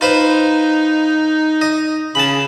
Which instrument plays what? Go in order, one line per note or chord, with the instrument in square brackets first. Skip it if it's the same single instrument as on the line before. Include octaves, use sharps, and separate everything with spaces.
[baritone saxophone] D#4 [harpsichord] F4 B4 C5
[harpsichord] D#5
[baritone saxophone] C#3 [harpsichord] A5 B5